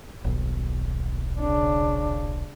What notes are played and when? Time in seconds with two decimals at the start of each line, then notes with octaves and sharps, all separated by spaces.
0.24 D#1 B1
1.40 C#3 D4